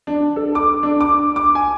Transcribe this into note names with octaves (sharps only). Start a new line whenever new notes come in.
D4
A4
D6
D4
D6
D6
G#5